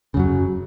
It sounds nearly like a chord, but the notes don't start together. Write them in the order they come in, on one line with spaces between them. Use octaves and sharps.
C#3 F#2 F#3